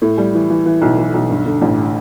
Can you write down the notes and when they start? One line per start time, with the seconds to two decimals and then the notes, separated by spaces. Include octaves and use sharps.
0.02 A2
0.17 G3
0.34 E3
0.50 E3
0.66 E3
0.82 B1
0.98 E3
1.14 B1
1.29 G2
1.45 D3
1.62 A1